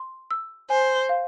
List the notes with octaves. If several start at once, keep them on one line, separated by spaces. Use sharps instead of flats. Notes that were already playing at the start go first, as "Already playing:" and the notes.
Already playing: C6
E6
C5 G#5
F5